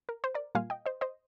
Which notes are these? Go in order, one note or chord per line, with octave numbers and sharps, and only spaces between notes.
A#4
C5
A#4 D5
A#2 G3 A#3 F4 F5 G#5
D#5 G5
C5 D#5
C5 D#5